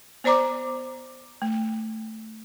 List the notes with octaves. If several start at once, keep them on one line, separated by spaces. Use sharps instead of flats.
B3 C5 D5 A#5 D6
A3